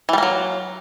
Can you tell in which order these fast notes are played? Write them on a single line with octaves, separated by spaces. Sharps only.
E3 G3 A#3 F#3